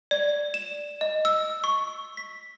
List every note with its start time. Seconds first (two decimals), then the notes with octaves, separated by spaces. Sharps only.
0.11 D5
0.54 E7
1.01 D#5
1.25 E6
1.64 C#6
2.17 B6